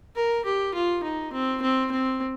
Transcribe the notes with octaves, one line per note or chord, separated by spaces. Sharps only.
A#4
G4
F4
D#4
C4
C4
C4